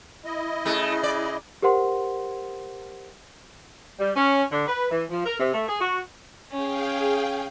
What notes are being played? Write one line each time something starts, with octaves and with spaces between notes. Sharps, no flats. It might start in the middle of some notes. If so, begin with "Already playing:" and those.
E4 D#5
C#3 A3
D5
G4 A#4 C5 F#5 C6
G3
C#4
D3
B4
E3
F3
A#4
C3
A3
G#4
F#4
C#4 G#4 F5 G5